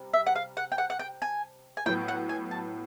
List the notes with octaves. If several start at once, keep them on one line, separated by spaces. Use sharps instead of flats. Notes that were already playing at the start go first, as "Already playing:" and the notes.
Already playing: C3 G3
E5
F#5
F5
F#5
G5
F#5
F#5
G5
G#5
G#5
A2 F#3 B3 G5
F#5
G#5
A5